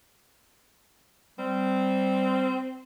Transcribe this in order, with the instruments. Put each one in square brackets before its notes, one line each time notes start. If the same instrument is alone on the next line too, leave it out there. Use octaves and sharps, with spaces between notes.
[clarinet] G3 [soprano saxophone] C4